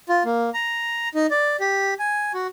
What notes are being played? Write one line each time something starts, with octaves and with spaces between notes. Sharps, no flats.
F4
A#3
A#5
D#4
D5
G4
G#5
F#4